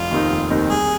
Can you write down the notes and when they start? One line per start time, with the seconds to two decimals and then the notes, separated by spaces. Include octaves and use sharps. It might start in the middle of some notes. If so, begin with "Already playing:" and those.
Already playing: F1 F4
0.11 D#2 D#3 C4 D#4
0.30 F1
0.50 D#2 D#3 C4 D#4
0.70 C2 G#4